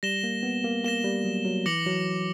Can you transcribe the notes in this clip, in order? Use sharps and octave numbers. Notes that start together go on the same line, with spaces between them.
G3 A#6 E7 G7
A#3
B3
A#3
A#3 A#6 E7 G7
G3
F#3
F#3
E3 D6 A#6 C#7 F#7
F#3